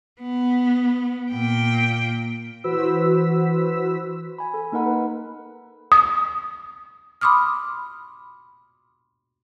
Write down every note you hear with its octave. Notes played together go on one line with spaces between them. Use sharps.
B3
A#2 G5
E3 F#4 B4 C5 E6 B6
G#5 B5
A4
A#3 D#4 A#4 F#5 B5
B4
D#6
B5 C6 D6 D#6 F6